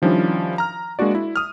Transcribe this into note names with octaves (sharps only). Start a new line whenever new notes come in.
D#3 F3 G3 C#4 D4 E4
A#5 F6
G#3 A#3 D4 F#4 D5
E4
D#6 F6